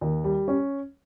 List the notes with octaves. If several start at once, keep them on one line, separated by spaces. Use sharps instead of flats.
D#2
G3
C#4